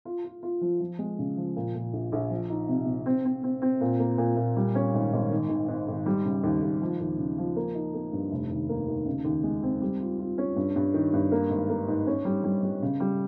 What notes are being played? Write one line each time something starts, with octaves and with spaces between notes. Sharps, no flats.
F4
F4
F4
F3
F3
G#3
C#3
F3
A#2
A#2
A#1
A#1
F3
D#4
C3
C3
C4
C4
C4
C4
A#2
A#3
A#2
A#2
G3
C#4
G#1
G#1
D#3
D#3
G#2
G#1
G3
C#3
D#2
D#2
F3
D#2
C#3
F3
A#3
D#4
A#3
G2
F1
D#2
A#3
D#3
C#3
D#2
G#3
C4
G3
F4
F4
C#4
G2
G2
D#3
G2
A#3
G#1
A#3
G#2
C#4
G3
G3
G3
C#3
G3